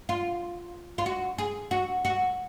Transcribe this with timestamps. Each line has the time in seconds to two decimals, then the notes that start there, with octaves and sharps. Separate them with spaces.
0.09 F4
0.98 F4
1.06 F#4
1.38 G#4
1.71 F#4
2.05 F#4